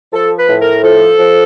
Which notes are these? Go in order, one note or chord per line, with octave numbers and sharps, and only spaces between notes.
F3 A4
B4
A2
A#4
F3 A4
F3